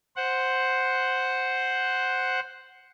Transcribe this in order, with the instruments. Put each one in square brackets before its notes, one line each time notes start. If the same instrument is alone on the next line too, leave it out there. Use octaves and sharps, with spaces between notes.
[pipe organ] C5 F#5